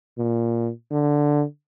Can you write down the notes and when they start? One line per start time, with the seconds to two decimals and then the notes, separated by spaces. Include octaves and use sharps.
0.18 A#2
0.92 D3